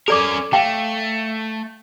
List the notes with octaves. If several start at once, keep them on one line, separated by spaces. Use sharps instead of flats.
C#4 A4 A#4 D5 D6
A3 F5 G5